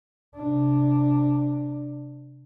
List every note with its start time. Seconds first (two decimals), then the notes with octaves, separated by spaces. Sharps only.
0.36 C3 D4